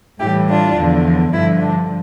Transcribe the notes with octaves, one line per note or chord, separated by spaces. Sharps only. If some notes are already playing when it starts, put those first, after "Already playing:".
A2 E3 G3 E4 G4
D4 F4
E2 D3 F3
G2 D3 F3 E4
D4